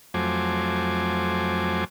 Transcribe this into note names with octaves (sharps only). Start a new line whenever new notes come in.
F2 F#3 A3 C5 G#5 D6